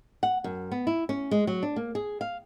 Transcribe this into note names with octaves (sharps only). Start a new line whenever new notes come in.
F#5
F#2
B3
E4
C#4
G#3
F#3
D4
A#3
G#4
F5